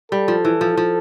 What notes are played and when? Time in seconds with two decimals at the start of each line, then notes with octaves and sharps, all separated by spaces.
0.11 G3 A4
0.28 F3
0.45 E3
0.61 F3
0.77 F3